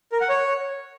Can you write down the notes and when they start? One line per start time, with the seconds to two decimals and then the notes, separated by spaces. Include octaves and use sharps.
0.12 A#4
0.21 F#5
0.29 C#5